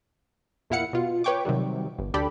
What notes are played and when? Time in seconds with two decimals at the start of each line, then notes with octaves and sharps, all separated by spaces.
0.70 E2 A#2 E4 F5 F#5 C#7
0.93 B2 F4
1.24 B4 C#5 G5 C#6 D6
1.45 C3 D#3 F#3 G3
1.99 G1
2.14 D2 D4 G4 A4 B5